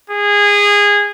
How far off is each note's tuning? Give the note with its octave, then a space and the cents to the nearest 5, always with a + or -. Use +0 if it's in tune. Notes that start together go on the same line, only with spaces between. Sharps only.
G#4 -20